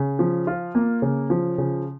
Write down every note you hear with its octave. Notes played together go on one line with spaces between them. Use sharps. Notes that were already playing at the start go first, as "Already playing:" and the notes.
Already playing: C#3
F3
F4
A#3
C#3
F3
C#3